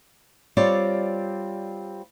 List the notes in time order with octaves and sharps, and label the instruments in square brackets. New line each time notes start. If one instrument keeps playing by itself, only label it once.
[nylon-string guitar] G3 C4 F4 C#5 D5